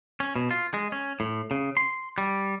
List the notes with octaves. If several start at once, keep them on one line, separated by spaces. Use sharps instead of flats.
C#4
B2
F4
G#3
C#4
A2
C#3
C6
G3